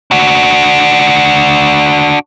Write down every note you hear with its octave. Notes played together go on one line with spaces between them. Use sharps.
D4 F#4